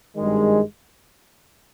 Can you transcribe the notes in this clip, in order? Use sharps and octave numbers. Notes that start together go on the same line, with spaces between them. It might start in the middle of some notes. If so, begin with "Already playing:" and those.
G#1 G2 D#3 G#3